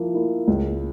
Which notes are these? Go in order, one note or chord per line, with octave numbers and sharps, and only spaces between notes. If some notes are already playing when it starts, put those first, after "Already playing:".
Already playing: F3 A#3 E4
A#3 E4
C#2